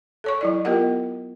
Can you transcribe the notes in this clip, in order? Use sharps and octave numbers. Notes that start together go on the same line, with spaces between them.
A4 C#5 C#6
F#3 E4 D5
B3 F4 G4 A#4 D#5 F#5